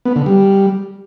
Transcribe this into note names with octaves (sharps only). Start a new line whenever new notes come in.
B3
D3
G3